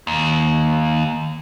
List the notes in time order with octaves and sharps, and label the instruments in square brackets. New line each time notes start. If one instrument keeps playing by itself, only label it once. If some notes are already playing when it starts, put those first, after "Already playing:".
[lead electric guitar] D#2